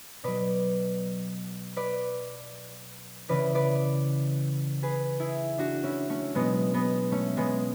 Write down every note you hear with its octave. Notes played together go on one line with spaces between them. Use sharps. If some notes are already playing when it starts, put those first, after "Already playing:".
B2 F#3 B4 D5
B4 D5
C#3 E3 B4 D5
B4 D5
G#4 B4
E4 G#4
D4 F#4
C#4 E4
A3 C#4
B2 F#3 G#3 B3
G#3 B3
A3 C#4
G#3 B3